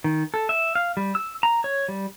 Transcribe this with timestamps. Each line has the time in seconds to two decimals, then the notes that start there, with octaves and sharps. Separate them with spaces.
0.04 D#3
0.34 A4
0.49 E5
0.75 F5
0.97 G3
1.15 E6
1.43 A#5
1.64 C#5
1.88 G3